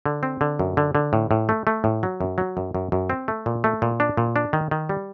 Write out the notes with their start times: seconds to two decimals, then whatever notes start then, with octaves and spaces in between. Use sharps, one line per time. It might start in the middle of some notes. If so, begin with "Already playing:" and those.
0.06 D3
0.23 C4
0.41 D3
0.59 F#2
0.77 D3
0.95 D3
1.13 A2
1.31 A2
1.49 A3
1.67 A3
1.84 A2
2.03 F#3
2.21 F#2
2.38 F#3
2.57 F#2
2.75 F#2
2.92 F#2
3.10 C4
3.28 A3
3.46 A#2
3.64 A3
3.82 A#2
4.00 D4
4.17 A#2
4.36 D4
4.53 D#3
4.71 D#3
4.89 G3